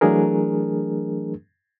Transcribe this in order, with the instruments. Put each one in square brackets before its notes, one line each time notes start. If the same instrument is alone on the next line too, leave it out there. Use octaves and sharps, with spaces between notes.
[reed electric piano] E3 F#3 A3 D4 G#4 A#4